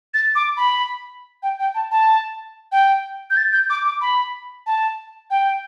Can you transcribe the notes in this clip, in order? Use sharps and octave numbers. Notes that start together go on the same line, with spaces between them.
A6
D6
B5
G5
G5
A5
A5
G5
G6
A6
G6
D6
D6
B5
A5
G5